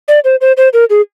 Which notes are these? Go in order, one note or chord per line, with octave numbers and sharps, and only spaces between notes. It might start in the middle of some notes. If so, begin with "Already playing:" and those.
D5
C5
C5
C5
A#4
G#4